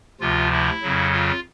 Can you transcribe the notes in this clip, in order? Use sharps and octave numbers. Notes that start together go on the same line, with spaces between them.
D2 C3 F3 F4
E4
F2 C#3 F#3
F4